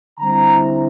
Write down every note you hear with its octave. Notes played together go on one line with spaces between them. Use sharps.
D3 G3 C4 E4 A#5